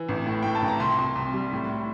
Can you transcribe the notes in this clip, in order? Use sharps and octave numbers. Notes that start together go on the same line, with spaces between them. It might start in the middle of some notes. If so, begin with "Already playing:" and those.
Already playing: E3
A1
A2
A2 G5
A5
A1
A#5
C2 C6
C2
C2
G3
A2
A2